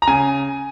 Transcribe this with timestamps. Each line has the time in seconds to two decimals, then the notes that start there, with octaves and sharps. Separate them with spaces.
0.02 A#5
0.07 C#3 G#5